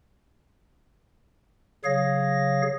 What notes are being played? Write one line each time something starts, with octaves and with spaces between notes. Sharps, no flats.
C#3 F#3 G#4 C#5 F5 A#6